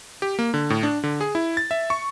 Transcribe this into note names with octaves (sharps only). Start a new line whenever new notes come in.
G4
A#3
D3
A2
D4
D3
G#4
E4
A6
E5
C#6